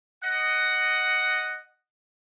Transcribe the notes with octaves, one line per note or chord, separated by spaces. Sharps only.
D#5 F#5